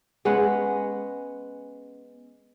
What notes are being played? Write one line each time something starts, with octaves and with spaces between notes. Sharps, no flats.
G#3 B3 C#4 F#5